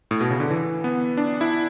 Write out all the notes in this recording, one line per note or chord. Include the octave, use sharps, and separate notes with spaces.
A2
B2
C#3
D3
E3
B3
D4
E4